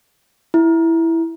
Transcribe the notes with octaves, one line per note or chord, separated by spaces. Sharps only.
E4